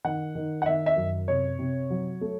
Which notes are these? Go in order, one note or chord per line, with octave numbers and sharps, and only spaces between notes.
D#3 F#5
D#3
F#5
D#3 E5
E5
F#2
C3 C#5
C3
F#3
A3